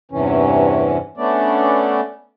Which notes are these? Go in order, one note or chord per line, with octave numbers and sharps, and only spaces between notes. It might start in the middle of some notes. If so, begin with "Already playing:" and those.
E2 G2 C3 E3 C#4
A3 B3 C#4 D4 D5